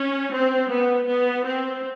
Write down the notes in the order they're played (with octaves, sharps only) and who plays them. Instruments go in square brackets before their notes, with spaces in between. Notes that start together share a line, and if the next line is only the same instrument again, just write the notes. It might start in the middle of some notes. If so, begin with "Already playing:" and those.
Already playing: [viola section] C#4
C4
B3
B3
C4